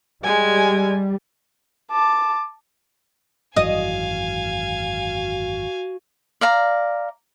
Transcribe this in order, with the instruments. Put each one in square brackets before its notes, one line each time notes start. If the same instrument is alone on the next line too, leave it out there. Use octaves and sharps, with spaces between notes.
[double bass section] G3 [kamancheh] G#3 G#5
[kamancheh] A5 D6
[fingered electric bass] G#1 F#2 E3 [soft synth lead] F#4 [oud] D#5 [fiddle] F5 G#5
[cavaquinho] D5 F5 A#5